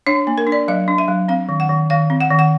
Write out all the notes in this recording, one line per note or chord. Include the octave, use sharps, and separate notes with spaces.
D4 C#5
A#3
A#4
D4
D5
F#3 D#5
D4
E5
F#3
C4 F5
D#3
F#5
D#3
D#3 F5
C4
F#5
D#3
F#5